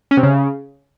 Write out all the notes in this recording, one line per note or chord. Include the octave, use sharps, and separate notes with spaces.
C#4
C3
C#3